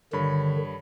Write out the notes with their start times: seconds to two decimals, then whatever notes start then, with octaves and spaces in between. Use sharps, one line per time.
0.13 G2 D3 D#3 C#5 B5